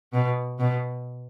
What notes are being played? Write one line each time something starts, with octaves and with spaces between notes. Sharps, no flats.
B2
B2